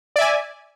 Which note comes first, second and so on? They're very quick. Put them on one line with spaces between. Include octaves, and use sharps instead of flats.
D5 E5 G#5